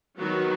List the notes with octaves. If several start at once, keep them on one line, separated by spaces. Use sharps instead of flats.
D#3 F#3 B3 F#4